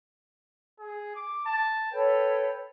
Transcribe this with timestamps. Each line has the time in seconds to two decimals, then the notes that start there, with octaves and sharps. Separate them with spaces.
0.80 G#4
1.16 D6
1.46 A5
1.93 A4 B4 C#5 G5